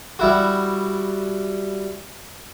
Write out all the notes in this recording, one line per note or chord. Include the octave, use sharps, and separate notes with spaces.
G3 E4 F#4